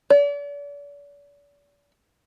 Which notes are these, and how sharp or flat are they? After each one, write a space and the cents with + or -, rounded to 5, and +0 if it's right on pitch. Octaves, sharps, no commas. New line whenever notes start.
D5 -40